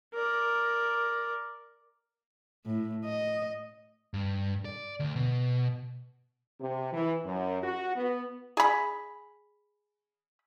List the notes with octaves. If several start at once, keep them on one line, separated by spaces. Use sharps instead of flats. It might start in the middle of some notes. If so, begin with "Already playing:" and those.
A#4 D5
A2
D#5
G2
D5
D2
B2
C3
E3
F#2
F#4
B3
G#4 B5